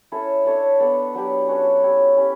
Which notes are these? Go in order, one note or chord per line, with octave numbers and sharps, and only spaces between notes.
C#4 E4 A4
D4 A4 C#5 E5
B3 D4 A4
F#3 B3 D4 G4
C#4 F#4 B4
E4 G4 C#5 E5
C#4 E4 G4